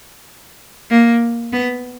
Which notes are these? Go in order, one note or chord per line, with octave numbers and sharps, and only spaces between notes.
A#3
B3